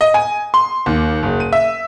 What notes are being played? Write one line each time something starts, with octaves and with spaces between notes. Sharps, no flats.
D#5
G#5
C6
D#2
F#1
D#7
E5